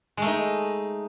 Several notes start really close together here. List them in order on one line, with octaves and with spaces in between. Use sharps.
G#3 A3 D#4